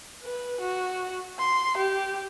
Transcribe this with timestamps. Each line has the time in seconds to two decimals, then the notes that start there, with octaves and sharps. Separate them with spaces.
0.23 B4
0.61 F#4
1.39 C6
1.78 G4